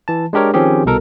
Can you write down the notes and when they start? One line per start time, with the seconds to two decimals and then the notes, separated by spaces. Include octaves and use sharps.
0.08 E3 A5
0.33 G#3 D4 G4 A#4 C#5
0.54 D#3 F3 C4 C#4 G4 G#4
0.86 C2 B2 A4 A#4